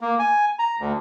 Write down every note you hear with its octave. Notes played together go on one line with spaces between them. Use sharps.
A#3
G#5
A#5
D2